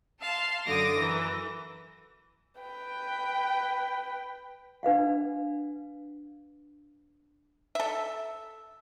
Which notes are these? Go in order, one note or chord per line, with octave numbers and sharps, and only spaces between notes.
F5 A5 C6
F#2 D3 D6 D#6 A#6
E3 A#4 A#5
B4 G5
D4 B4 F5 F#5
A4 E5